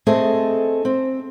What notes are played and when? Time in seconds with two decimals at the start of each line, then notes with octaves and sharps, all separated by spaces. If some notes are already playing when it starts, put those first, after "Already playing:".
0.06 A3 C4 G#4 A4 D#5
0.85 C4